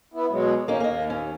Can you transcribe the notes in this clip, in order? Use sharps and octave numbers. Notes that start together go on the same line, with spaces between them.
B3 E4
B2 F#3 G#3
D#3 A#3 C#4 D#4 G#4
D#2 A#3 D#5
C#4